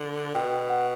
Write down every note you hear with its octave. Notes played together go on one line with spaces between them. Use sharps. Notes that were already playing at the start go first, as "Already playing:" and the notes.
Already playing: D3
B2 G5
F#5